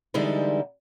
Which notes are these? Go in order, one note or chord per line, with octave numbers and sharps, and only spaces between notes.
D3 E3 G3 G#3 D#4 E4